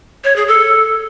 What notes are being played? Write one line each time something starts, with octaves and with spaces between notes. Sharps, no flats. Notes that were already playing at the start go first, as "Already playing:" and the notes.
C#5
G#4
A4